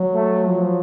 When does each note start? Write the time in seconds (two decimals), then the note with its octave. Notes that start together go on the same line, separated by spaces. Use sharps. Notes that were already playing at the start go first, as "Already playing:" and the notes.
Already playing: F#3
0.13 A3
0.45 F3